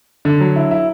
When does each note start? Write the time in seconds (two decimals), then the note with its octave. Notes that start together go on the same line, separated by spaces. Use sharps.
0.25 D3
0.40 F#3
0.56 E4
0.71 E4